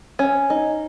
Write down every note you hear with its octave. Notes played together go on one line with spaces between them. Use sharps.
C#4
D#4